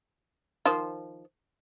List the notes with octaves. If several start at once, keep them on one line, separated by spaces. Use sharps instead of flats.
D#3 F3 C5